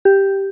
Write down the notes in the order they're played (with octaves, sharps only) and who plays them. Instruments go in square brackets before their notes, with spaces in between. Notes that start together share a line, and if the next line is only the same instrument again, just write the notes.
[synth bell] G4